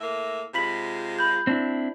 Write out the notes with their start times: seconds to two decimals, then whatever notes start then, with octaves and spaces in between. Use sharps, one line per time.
0.01 A2 A#3 E5
0.54 C3 G#3 F4 B5 B6 F#7
1.19 B5 G6
1.47 C4 D4 E4